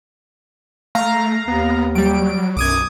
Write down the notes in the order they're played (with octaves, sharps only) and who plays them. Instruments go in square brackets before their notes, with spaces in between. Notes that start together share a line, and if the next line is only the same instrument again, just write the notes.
[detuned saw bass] A3 [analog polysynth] F5 A#5
[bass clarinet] D#2 [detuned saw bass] B3
[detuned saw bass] F#3 [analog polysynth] G3 D7
[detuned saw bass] B1 [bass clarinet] F#2 [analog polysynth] D6 D#6 G#6